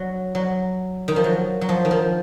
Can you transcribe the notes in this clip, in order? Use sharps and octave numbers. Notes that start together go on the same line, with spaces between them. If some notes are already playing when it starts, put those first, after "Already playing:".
Already playing: F#3
F#3
D#3
F3
F#3
F#3
F3
D#3
F3